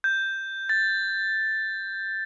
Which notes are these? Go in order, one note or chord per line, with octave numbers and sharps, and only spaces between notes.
G6
A6